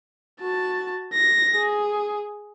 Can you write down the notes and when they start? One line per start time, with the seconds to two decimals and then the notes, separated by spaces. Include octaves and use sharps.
0.41 F#4 A5
1.14 A#6
1.55 G#4